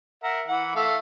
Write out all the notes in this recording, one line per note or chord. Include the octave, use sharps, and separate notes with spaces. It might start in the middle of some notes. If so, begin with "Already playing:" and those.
A#4 E5 F#5
E3 F#5
A3 E5 F5